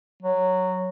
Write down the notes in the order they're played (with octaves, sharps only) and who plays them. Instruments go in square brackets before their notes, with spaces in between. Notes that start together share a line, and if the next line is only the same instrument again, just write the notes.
[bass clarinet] F#3